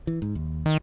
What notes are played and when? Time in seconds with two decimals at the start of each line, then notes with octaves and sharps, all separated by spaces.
0.07 E3
0.22 G#2
0.35 D#2
0.66 D#3